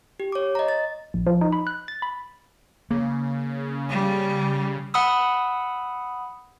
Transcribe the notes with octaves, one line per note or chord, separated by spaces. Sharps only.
G4
C#5 D6
D#5 A#5
A6
A#1
F3
D#4
B5
F#6
A6
B5
C#3 A#3
G3
F#5 B5 D#6 E6